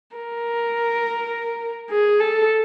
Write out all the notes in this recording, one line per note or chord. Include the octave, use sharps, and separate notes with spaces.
A#4
G#4
A4